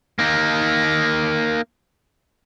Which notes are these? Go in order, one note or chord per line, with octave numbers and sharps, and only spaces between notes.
A#3 D#4